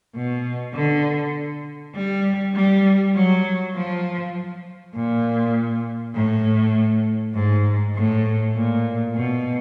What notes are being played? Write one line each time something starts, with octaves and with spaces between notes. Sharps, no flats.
B2
D3
G3
G3
F#3
F3
A#2
A2
G#2
A2
A#2
B2